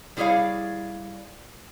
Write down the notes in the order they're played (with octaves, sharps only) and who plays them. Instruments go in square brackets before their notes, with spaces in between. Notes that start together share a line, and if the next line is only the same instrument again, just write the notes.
[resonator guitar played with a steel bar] G3 E4 G#4 C#5 D5 F5